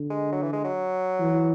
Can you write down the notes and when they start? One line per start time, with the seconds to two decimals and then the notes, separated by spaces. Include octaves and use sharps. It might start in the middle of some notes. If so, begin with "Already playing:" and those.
Already playing: D3
0.10 G#3
0.32 F#3
0.42 E3
0.53 G#3
0.64 F#3
1.20 E3